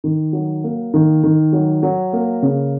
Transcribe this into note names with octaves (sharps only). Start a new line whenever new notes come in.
D#3
F#3
A#3
D#3
D#3
F#3
F#3
A#3
C#3